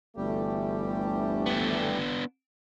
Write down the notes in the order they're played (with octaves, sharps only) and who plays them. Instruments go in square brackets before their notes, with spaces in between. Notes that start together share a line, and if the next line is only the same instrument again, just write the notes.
[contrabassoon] G1 [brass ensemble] D2 E3 A3 [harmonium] G3 G4
[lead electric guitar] B3 D4